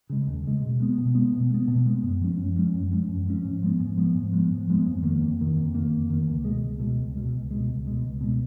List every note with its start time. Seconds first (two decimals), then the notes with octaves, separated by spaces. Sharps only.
0.10 C#3 G#3
0.27 D#2
0.44 C#3 G#3
0.62 B2
0.80 G#3 B3
0.98 B2
1.15 G#3 B3
1.33 B2
1.50 G#3 B3
1.68 B2
1.86 G#3 B3
2.03 F#2
2.21 F3 G#3 C#4
2.38 F#2
2.56 F3 G#3 C#4
2.74 F#2
2.91 F3 G#3 C#4
3.09 F#2
3.26 F3 G#3 C#4
3.44 G#2
3.63 F3 G#3 B3
3.80 G#2
3.97 F3 G#3 B3
4.15 G#2
4.32 F3 G#3 B3
4.50 G#2
4.67 F3 G#3 B3
4.86 F2
5.03 D#3 A#3
5.21 F2
5.39 D#3 A#3
5.56 F2
5.75 D#3 A#3
5.91 F2
6.10 D#3 A#3
6.27 C#2
6.44 B2 G#3
6.62 C#2
6.79 B2 G#3
6.98 C#2
7.16 B2 G#3
7.33 C#2
7.51 B2 G#3
7.68 C#2
7.86 B2 G#3
8.03 C#2
8.21 B2 G#3